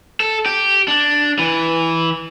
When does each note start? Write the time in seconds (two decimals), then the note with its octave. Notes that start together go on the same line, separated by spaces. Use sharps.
0.20 A4
0.46 G4
0.88 D4
1.39 E3